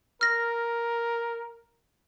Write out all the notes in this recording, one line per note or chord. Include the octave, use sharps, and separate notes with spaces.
A#4 F6 A#6